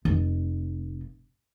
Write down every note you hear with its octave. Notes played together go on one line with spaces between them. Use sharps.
F1